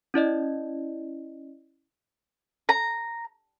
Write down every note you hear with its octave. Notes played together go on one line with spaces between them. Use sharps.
C#4 E4 D5 D#5
A#5